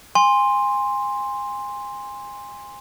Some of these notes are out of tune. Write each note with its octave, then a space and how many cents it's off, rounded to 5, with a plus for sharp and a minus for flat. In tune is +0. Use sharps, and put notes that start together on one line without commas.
G#5 -25 C6 +5